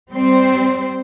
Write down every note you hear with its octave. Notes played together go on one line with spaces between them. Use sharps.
G3 C4 C5